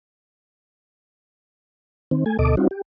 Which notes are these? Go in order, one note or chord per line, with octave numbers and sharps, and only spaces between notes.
D#3 C4
A3 G#5
D2 B2 A4 D#5 D6
G3 C4 C#4 D#4 F4 F#4
G4